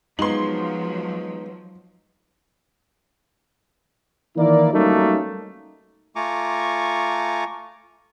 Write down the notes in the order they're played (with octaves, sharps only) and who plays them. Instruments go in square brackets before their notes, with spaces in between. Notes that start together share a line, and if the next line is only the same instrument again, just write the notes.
[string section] F3 F#3 [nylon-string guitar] G#3 B3 [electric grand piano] D#4 [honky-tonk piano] C6 F#7
[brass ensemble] D#3 E3 A#3 E4 A#4 D5
F#3 G3 A3 A#3 C#4 D#4
[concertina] A3 F4 G#5 A#5 C#6 D6